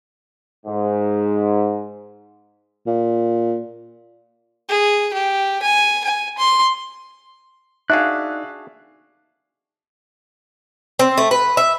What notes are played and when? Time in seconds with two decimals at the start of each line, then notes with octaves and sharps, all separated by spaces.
0.66 G#2
2.87 A#2
4.69 G#4
5.14 G4
5.62 G#5
6.04 G#5
6.38 C6
7.90 D4 D#4 F#4 G#4 D5 E5 F5 F#6
10.99 C4
11.18 A3
11.31 B4
11.57 E5